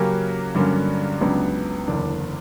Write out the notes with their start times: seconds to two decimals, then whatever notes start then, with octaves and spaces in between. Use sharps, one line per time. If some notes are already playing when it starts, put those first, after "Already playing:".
Already playing: C#3 F#3 A#3 C#4 G4
0.55 G2 D3 F#3 A#3 C#4
1.21 C#2 C#3 F#3 B3 D4
1.87 F#1 E2 D3 A#3 D4